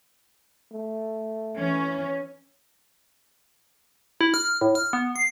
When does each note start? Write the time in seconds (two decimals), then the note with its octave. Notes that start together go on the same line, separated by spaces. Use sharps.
0.72 A3
1.56 E3 C#4
4.21 E4
4.34 F6
4.61 A2
4.75 F6
4.93 B3
5.16 C7